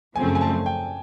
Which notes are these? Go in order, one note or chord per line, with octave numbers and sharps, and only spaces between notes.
F#2 C#3 F3 A3 C4 G#5
G#5
A5
G5